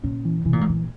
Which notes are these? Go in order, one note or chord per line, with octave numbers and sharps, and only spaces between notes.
A#2 C#4
E3
C3 E3
A#2
G#2
A#2 E3